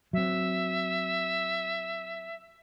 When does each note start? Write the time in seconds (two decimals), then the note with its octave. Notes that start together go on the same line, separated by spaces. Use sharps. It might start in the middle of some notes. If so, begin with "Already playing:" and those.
0.13 F#3 C4 E5